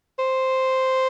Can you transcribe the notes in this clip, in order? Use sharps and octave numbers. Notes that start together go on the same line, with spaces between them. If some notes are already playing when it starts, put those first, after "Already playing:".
C5